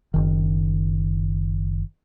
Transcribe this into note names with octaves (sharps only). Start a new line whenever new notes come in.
F#1 D#3